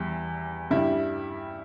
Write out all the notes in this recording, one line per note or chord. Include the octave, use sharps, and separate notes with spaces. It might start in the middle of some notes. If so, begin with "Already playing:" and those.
Already playing: E2 E3 G3
G2 G3 E4